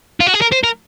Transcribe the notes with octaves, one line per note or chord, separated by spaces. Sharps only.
F4
F#4
G#4
A#4
C5
A#4